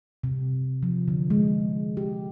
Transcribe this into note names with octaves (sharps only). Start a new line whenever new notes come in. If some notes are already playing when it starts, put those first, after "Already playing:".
C3
F3
D3
G#3
G4